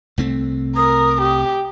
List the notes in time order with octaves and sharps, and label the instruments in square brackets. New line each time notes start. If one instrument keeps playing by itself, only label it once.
[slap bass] C2 A3 C4
[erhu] A#4 [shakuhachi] D#6
[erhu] G4